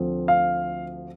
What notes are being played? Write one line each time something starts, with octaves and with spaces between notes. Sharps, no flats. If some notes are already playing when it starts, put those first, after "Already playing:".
Already playing: D2 D3 F3 C4
F5